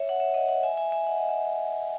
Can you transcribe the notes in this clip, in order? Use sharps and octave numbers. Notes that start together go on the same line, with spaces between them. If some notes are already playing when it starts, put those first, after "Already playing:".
Already playing: C#5 E5
F#5
C#5 E5
D#5 F#5
D#5 F#5
E5 G#5
E5 G#5
E5 G#5
D#5 F#5
D#5 F#5
E5